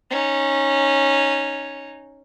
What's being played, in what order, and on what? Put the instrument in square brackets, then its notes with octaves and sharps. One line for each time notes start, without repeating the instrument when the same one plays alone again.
[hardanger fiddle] C#4 D#4